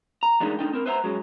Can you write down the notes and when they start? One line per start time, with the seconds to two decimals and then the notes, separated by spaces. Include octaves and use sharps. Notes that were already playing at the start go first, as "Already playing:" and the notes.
0.23 A#5
0.40 E3 G3 G#3 A#3 D4 D#4
0.59 C#2 G#3 D4 D#4 A4 G5
0.73 C4 A#4
0.86 B4 C5 E5 F#5 A#5
1.04 F#3 G#3 C#4